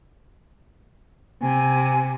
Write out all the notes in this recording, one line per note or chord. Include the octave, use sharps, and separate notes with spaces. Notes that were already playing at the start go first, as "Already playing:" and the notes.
C3 G#5